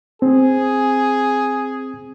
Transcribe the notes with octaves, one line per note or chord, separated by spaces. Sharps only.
C4 G#4